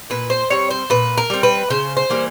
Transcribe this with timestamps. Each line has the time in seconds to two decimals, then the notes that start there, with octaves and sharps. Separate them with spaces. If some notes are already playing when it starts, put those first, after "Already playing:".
0.10 A#2 B4
0.30 C5
0.50 G3 C4 C#5
0.70 C5
0.90 A#2 B4
1.18 A#4
1.30 G3 C4
1.43 B4
1.70 C#3 C5
1.97 C5
2.10 E3 G3 A#3